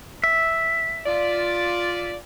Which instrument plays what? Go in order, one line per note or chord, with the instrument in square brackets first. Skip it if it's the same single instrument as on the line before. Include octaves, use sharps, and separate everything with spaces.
[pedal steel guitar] E5
[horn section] F4 D5